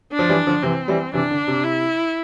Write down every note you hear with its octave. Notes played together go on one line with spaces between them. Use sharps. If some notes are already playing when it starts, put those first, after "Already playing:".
D4
F3
E3 G3
D3 F3
C3 E3 C4
E3 G3
C3 E3 D4
D3
C3
E4